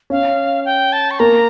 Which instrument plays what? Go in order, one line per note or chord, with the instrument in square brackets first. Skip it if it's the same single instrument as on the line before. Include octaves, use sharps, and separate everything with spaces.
[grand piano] C#4 [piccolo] F5
[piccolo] G5
A5
C#6
[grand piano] A#3 [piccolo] A#5